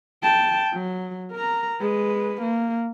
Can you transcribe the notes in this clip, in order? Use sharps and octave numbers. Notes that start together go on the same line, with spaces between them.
G5 A5
F#3
A#4 A#5
G#3 B4
A#3